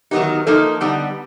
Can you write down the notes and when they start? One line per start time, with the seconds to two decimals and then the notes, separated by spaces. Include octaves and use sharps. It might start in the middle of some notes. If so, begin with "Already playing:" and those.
0.11 D#3 F#3 B3 D#4 G4
0.46 F3 A#3 D#4 A4
0.81 D3 G3 B3 D#4